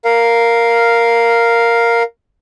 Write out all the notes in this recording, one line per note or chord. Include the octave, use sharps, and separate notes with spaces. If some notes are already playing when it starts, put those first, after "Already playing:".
A#4 F5